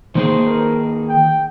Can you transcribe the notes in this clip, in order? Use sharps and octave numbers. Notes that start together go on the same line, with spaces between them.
D#3 A#3 D#4 G#4 C5
A#4
G5